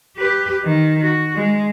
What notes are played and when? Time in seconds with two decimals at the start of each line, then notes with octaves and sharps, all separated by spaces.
0.17 G4 B4
0.64 D#3
1.01 F#4
1.36 G#3